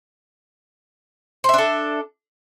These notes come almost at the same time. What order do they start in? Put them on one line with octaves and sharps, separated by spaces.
C5 E5 D4 A4